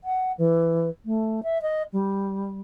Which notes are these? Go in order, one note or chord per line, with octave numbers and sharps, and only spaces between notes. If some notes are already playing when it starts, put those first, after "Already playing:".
F#5
E3
A3
E5
D#5
G3